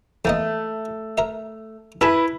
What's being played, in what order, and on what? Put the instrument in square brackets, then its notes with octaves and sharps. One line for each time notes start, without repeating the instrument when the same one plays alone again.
[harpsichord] E2 A#3 D#5 [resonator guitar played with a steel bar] A3
[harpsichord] A#4 E5
[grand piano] E4 [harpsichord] G#4 A4 A5 [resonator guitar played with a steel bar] B4